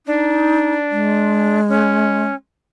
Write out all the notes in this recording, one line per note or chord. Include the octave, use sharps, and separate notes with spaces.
D4 D#4
G#3
C#4